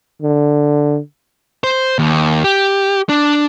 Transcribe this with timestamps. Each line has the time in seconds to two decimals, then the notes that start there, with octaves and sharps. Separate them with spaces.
0.22 D3
1.64 C5
1.99 D#2
2.44 G4
3.09 D4